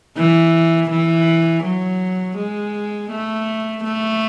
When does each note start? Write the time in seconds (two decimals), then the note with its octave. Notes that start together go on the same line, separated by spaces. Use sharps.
0.17 E3
0.90 E3
1.64 F#3
2.37 G#3
3.11 A3
3.84 A3